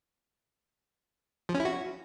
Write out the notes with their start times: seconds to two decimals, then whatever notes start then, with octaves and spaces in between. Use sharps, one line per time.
1.49 F3
1.54 C#4
1.60 E4
1.65 F#4